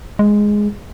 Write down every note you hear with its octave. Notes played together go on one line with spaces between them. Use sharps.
G#3